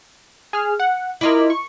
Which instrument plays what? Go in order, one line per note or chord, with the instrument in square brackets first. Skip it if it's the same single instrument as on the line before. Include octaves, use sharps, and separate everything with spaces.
[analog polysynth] G#4 F6
F#5
[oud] E4 F4 [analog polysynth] A#4 D#5 D6
[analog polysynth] C#6